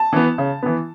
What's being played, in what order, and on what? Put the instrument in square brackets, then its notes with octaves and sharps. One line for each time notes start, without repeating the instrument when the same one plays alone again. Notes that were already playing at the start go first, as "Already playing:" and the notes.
Already playing: [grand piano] A5
E3 B3
C#3
E3 B3